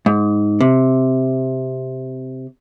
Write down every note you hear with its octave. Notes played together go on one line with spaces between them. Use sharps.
G#2
C3